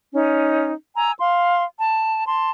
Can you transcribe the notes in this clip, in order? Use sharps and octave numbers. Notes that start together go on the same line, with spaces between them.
C#4 D#4
G#5 A#5 E6
F5 C6
A5
A5 C6